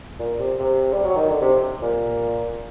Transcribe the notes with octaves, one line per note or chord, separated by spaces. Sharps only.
A#2
C3
C3
G3
F#3
D#3
D3
C3
A#2